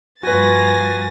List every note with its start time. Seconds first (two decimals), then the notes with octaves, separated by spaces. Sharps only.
0.23 G2 F3 A#3 F#4 B4 G#5 A6 A#6